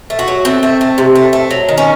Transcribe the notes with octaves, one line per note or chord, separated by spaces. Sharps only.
A3
F#4
F#3
A3 C4
A3
A3
C3
A3
A3
F#3
D#3
C#4